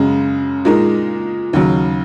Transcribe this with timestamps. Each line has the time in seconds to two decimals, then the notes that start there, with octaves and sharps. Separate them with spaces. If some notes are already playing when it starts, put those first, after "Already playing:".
Already playing: F#2 C#3 G#3 C#4
0.65 A#2 G#3 D#4 A#4
1.53 D#2 C#3 F#3